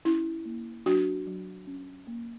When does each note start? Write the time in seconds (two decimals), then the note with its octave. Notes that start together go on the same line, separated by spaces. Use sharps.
0.05 C#4 E4
0.46 A#3
0.86 F#3 D4 F#4
1.27 F#3
1.67 C#4
2.07 A#3